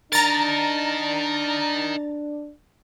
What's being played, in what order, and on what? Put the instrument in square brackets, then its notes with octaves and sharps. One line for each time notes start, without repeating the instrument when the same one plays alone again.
[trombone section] D4 [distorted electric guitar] D#4 A#4 [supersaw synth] A#5 A6